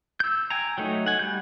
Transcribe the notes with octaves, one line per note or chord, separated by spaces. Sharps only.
E6 G6
G5 G#5 A#5
F#3 A3 D#4
F#5 G#5
G3 G6